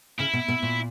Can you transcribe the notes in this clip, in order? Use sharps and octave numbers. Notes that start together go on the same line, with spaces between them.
C#3 E4
B2
B2
A#2